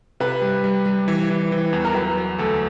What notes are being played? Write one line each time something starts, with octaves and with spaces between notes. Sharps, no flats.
C3 B4
G3
G3
G3
E3
E3
E3
E2
A#4
F#3 B4
F#3
D2 A4